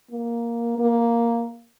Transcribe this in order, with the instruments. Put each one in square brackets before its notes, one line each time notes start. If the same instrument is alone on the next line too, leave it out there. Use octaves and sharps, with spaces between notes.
[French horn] A#3
A#3